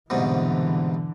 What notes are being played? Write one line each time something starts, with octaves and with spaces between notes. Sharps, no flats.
C2 G#2 B2 D3 E3